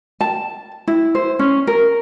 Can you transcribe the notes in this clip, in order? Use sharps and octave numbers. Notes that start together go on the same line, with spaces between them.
A5
E4
C5
C#4
A#4